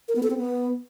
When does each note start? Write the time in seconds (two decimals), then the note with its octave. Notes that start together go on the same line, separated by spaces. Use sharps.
0.08 A#4
0.16 B3
0.23 A4
0.30 C4
0.37 B3